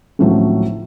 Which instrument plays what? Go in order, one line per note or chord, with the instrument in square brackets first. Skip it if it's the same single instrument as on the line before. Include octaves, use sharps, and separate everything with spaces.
[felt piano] G#1 C#2 A2 F3 F#3